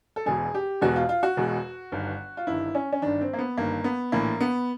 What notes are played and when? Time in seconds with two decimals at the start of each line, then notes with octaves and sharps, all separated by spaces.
0.16 A4
0.26 E1 E2 B2 G#3 G#4
0.54 G4
0.81 E1 E2 B2 G#3 F#4
0.96 F4
1.09 F4
1.23 F#4
1.37 E1 E2 B2 G#3
1.92 G1 G2 D#3
2.37 F4
2.47 G1 G2 D#3 E4
2.75 C#4
2.93 C#4
3.02 G1 G2 D#3 D4
3.21 C4
3.33 A#3
3.39 B3
3.58 G1 G2 D#3 A#3
3.84 B3
4.12 A#1 A2 E3 A#3
4.41 B3